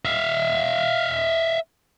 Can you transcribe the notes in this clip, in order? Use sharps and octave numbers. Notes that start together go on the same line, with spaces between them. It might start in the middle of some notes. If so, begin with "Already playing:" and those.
E5 F5